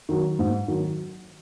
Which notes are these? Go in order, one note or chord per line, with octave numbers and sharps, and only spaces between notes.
D#3 F#3
G#2
D#3 F#3